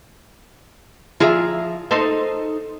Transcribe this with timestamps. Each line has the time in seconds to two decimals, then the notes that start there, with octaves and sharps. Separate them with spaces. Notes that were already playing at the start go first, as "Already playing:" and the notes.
1.20 F3 F4 G#4 E5 A#5
1.91 D#4 A4 C5